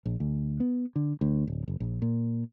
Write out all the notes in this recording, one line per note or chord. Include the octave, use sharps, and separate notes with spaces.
A#1
D2
B3
D3
D2
D1
F#1
A#1
A#2